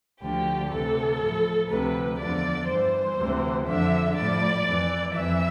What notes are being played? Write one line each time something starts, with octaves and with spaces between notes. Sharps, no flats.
D2 D3 F3 G4
D2 C3 E3 A4
A2 F3
D2 C3 F3 B4
E2 D3 F3 D5
G2 E3 C5
D2 C3 E3
F2 D3 F3 E5
A2 F3 D5
F2 E3
F2 E3 E5